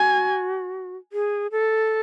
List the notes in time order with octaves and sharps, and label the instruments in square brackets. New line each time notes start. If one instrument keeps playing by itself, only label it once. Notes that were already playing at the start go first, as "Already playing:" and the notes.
Already playing: [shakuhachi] F#4 [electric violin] G#5
[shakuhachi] G#4
A4